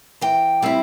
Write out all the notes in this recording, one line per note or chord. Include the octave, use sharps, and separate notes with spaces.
E3 G5
G3 C4 E4